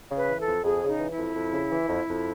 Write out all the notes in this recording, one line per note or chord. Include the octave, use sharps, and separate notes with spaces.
C#3
B4
E3
A4
F2
F2 G#4
C#3
D#4
E3
E4
F2
F2
C#3
E3
F2
F2